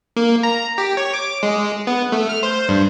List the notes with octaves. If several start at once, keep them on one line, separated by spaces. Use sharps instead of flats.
A#3
A#5
G4
C#5
D6
G#3
B3
A3
F6
C5
G2